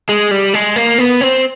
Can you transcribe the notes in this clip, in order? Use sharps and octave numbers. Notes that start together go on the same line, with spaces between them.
G#3
G3
G#3
A#3
B3
C4